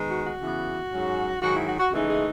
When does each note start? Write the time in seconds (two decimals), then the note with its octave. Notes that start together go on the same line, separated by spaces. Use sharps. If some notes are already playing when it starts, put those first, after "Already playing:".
Already playing: D#3 G#3 B3
0.08 F#4
0.24 F#4
0.41 C#3 E3 B3
0.91 G#2 F#3 C#4
1.41 G#2 D#3 F#3 F#4
1.54 E4
1.66 F#4
1.78 F#4
1.91 C#3 E3 G#3 A3 D#4 G#4
2.07 G#3 G#4